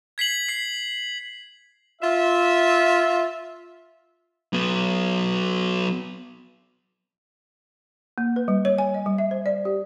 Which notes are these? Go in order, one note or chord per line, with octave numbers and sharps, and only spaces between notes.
G#6 B6 C7 F#7
B6 C7
F4 E5
F#3 B3
A#3
B4
G3
C#5
G#5
D#5
G3
E5
C5
D5
G4